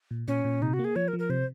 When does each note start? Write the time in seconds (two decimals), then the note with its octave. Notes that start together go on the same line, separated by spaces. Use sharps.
0.11 A#2
0.28 A#2 C#4
0.45 A#2
0.62 C3 D#4
0.73 F#4
0.79 A#3
0.85 G#4
0.96 F3 C#5
1.08 A#4
1.13 F3
1.19 A#4
1.30 C3 C5